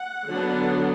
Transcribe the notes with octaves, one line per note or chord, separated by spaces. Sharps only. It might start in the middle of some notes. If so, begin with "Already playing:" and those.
Already playing: F#5
D3 F#3 B3 D4